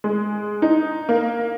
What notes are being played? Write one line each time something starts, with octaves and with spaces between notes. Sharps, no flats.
G#3
D#4
A#3